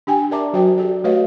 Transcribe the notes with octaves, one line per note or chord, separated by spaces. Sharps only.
D4 G4 G5 G#5
A#4 D5 E5 A5 A#5 D6
F#3 F#4 C5 G5
G4 A4 D5
A3 F#4 B4 C#5 D#5 F5